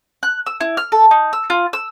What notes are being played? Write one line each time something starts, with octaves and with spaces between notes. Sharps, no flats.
F#6
E6
E4
F6
A4
D#4
E6
F4
E6